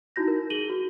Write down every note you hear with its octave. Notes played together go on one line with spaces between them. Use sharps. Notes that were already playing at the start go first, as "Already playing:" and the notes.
D#4 E4 F#4 G6 A#6
A#4
G#4 D#7 F#7 G7
F#4